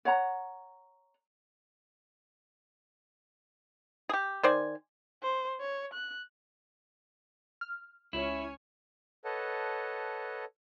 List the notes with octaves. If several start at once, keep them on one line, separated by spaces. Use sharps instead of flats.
C#5 F#5 A#5
G4 G#4
D#3 C5 D5 G#5
C5
C#5
F#6
F6
C#2 C#4 E4 C#5 G#5
A4 B4 C#5 D#5 F#5 A5